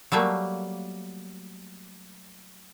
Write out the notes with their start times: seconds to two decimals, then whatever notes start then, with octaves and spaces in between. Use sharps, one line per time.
0.12 F#3 G3 A3 A#3